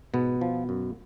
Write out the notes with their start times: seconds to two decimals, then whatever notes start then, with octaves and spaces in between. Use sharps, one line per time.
0.13 G#2 B2 B3
0.41 F3
0.69 F#2